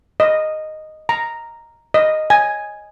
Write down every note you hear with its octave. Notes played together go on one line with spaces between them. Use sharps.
D#5
A#5
D#5
G#5